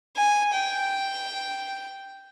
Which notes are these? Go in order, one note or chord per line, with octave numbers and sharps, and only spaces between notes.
G#5
G5